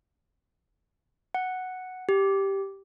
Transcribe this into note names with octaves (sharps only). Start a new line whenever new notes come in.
F#5
G4